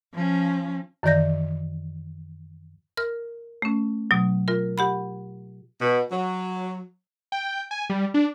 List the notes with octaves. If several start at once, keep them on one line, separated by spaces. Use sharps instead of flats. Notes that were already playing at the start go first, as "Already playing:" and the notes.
F3 C#4
F#2 D#3 E3 D5 G6 A#6
A#4 F6
A3 C#4
B2 F#3
F4 A#4
G4 F#5 B5
B2
F#3
G5
G#5
G3
D4